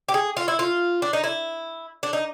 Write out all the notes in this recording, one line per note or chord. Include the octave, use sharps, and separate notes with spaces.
G4
G#4
F4
E4
F4
D4
D#4
E4
D4
D#4